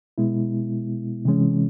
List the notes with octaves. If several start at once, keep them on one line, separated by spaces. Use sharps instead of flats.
B2 G#3 B3 E4
C3 E3 G#3 C#4